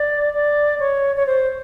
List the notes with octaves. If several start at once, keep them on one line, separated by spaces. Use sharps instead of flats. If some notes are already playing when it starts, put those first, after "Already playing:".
Already playing: D5
D5
C#5
C#5
C5